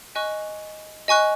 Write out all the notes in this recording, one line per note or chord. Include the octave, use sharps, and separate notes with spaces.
D#5 G#5 C#6 F#6
D#5 G#5 C#6 F#6